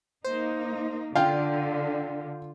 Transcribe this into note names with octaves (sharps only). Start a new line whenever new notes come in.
A#3 D#4 C5
D3 F4 F5 G5